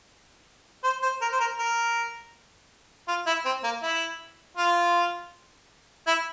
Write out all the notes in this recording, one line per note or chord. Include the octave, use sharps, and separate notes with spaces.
C5
C5
A#4
C5
A#4
A#4
F4
E4
C4
A#3
E4
F4
E4